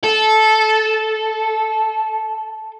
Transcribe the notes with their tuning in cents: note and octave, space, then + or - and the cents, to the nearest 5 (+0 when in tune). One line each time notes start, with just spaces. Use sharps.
A4 -15